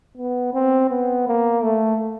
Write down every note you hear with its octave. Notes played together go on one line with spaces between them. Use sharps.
B3
C4
B3
A#3
A3